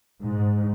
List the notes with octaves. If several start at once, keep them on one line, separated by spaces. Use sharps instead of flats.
G#2